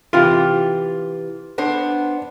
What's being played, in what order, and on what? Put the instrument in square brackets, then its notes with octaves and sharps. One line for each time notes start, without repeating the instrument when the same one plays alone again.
[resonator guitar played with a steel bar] C3 E3 G4 [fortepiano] F4
[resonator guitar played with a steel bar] B3 D4 C5